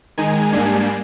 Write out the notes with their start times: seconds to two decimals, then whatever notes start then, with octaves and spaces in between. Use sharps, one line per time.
0.18 D#3 G#3 D#4 G#5
0.52 G#2 G3 A#3 D4 G#5